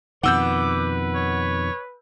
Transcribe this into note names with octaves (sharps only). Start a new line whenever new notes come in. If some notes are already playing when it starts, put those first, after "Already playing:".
F2 B2 D#3 B4 F#5 D6 E6 G6
C#5